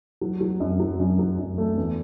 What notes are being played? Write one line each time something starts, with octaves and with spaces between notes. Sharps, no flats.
F#3
F#3
F#2
F#3
F#2
F#3
F#2
A3
E2